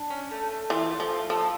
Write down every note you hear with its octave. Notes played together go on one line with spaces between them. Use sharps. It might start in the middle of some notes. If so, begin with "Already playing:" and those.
Already playing: D4
C#4
A3
A3
E3 F4
A3
F3
F4
F3 A4